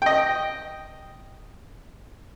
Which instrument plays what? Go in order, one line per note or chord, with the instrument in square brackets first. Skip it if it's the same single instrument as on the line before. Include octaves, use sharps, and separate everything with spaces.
[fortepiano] D#5 G5